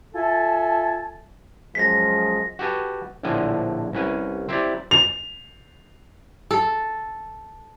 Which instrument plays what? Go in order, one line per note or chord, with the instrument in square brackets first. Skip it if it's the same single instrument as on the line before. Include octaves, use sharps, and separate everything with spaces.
[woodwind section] F4 A4 E5 G#5 A5
[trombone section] F#2 F3 G#3 [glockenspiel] A#6 B6
[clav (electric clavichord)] F#4 G4 A4 B4 G#5
A#1 A2 D3 F3 G#5
C2 C#4 B4 G#5
C4 E4 G4 D5
[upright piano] F7
[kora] A4